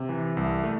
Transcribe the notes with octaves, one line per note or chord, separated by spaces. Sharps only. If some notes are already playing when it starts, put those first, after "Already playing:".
Already playing: C3
E3
C2
A3